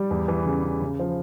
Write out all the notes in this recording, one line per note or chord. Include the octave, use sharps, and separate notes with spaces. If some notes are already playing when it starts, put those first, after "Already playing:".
Already playing: G3
E2
E3
C#3
C#3
C#3
F3